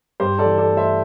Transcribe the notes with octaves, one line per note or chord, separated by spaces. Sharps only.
G2 G4 C5
A4 D5
E3
A4 D5
A3
C5 E5